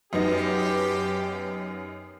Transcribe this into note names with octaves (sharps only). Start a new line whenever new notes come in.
F#2 B3 D#4 G4